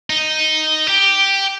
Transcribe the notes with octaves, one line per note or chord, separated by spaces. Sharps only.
D#4
G4